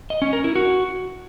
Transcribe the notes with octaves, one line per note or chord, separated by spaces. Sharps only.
D#5
C#4
A#4
E4
F#4